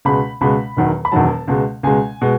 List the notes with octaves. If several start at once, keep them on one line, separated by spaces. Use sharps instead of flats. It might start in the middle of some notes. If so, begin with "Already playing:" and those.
C#2 B2 G#3 B5
C#2 B2 G#3 B5
E1 E2 D#3 F#3
B5
E1 E2 D#3 F#3 A5
C#2 B2 G#3
C#2 B2 G#3 G#5
B2 G#3